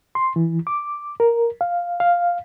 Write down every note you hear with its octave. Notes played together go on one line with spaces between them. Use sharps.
C6
E3
D6
A#4
F5
F5